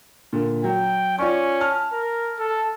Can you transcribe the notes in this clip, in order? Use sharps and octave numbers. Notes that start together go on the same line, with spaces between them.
A#2 D3
F#3 G5
C#4 F4 D5 C#6
A5 F6
A#4
A4